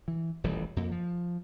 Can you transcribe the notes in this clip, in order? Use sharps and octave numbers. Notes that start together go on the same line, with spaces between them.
E3
D#1 A1 E3 G3
F2 A#3
F3